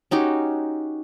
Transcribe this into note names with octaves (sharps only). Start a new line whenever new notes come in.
C#4 D#4 F#4 G4